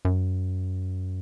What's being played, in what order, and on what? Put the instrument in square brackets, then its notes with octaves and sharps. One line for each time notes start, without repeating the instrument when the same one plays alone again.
[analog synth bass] F#2